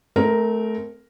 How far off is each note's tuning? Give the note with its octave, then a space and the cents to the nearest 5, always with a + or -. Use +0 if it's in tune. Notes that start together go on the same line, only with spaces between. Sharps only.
A3 -20 C4 -30 A#4 +0